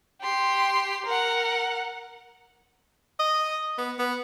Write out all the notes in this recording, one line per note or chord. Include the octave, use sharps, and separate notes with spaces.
G4 C6
A#4 F#5
D#5
B3
B3